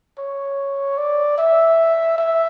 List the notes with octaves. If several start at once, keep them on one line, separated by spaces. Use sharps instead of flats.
C#5
D5
E5
E5